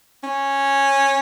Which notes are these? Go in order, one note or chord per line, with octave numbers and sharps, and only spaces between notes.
C#4